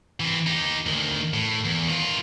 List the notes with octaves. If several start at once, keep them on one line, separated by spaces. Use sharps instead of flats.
E3 C4
D#4 G4
D2 D#3
A2
E2
D#3 F4